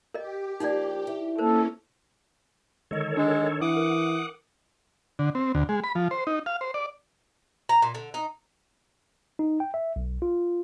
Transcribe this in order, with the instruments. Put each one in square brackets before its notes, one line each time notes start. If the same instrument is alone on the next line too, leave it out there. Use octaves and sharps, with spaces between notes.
[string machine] G4 [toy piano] A#4 D#5
[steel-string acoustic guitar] F3 A#3 D4 [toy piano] D#4 D5
[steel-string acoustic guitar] E3
[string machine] A#3 C#4 [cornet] A4 [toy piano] A#4 C5
[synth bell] D3 G#3 D#5 [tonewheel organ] D#3 A4 C#5
[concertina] G#3 [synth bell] D4
[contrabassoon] E3 [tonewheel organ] F#5 [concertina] D6 D#6
[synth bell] A#4
[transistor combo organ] D3
C4
D2
G#3
B5
F3
C5
D#4
F5
C5
D5
[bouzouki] A#5
A#2
D3
D#4
[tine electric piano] D#4
G5
E5
B1
F4